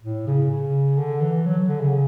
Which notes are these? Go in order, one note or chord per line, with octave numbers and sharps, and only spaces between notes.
A2
C#3
C#3
D3
E3
F#3
D3
C#3